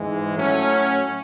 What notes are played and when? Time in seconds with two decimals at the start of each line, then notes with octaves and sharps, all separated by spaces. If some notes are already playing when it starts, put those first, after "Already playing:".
Already playing: G#2 E3 G#3
0.35 A2 F#3 A3 C#4